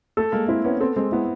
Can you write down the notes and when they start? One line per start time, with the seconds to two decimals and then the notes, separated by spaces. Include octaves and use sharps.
0.17 A3 A4
0.32 G#3 A#3
0.48 C4 E4
0.64 B3 C#4
0.80 C4 A4
0.96 G#3 C4
1.12 B3 E4